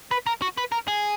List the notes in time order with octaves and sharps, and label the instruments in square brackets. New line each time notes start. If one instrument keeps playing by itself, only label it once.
[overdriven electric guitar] B4
A#4
F#4
B4
A#4
G#4